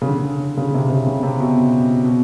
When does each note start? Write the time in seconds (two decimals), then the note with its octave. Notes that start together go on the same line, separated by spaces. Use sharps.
0.02 C#3
0.08 D3
0.57 C#3
0.74 C3
0.90 C3
1.07 C#3
1.23 C3
1.40 B2
2.04 B2